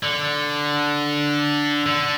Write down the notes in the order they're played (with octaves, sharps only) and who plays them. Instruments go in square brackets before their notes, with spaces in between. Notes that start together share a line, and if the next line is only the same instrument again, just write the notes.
[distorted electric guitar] D3
D3